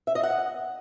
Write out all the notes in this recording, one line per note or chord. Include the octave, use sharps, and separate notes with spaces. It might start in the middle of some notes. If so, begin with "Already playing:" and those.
E5
D#5
F#5